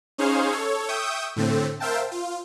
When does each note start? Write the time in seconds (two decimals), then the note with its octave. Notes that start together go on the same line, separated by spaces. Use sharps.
0.18 C#4 D#4 G#4 C5 C#5 F5
0.52 A4 C#5
0.89 E5 G5 C#6 D#6 G6 E7
1.36 A2 D3 A3 C4
1.80 A#4 C5 E5 F5 G5 A5
2.11 F4